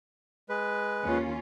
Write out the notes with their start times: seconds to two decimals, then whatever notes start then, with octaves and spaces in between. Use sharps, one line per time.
0.49 G#3 B4
1.04 D#2 C#4 F4